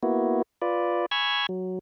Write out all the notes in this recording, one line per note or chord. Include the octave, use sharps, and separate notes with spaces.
A#3 B3 E4 F#4
F4 B4 D5
G#5 B5 C#6 E6 F6 G#6
F#3